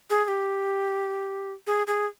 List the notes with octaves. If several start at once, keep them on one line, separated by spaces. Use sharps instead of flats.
G#4
G#4
G4
G#4
G#4